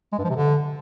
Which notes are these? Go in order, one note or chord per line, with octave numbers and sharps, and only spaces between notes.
G#3
G2
F3
C3
D3